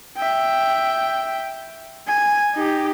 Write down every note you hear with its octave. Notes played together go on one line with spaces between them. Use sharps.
E5 G5
G#5
D#4 G4